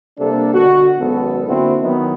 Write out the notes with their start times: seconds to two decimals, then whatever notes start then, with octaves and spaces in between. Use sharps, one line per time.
0.18 C3 G3 A#3 D4 A4
0.54 B2 D3 F#4
0.99 G#1 F#2 B2 B3 A4
1.48 D3 A#3 C4 E4 F#4
1.82 D#3 F#3 B3 E4